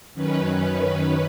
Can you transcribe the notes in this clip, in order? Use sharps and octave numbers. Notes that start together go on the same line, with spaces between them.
F#2 D#3 C#4 B4